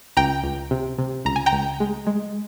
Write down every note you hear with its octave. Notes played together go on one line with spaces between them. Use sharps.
C#2 G5 A#5
C#2
C3
C3
C#2 A#5
G#5
G5 A#5
C#2
G#3
G#3